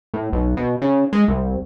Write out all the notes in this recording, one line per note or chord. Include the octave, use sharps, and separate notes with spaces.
A2
B1
B2
C#3
G#3
C2